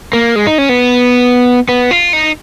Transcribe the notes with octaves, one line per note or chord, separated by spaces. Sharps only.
A#3
G#3
D#4
C#4
B3
B3
F4
D#4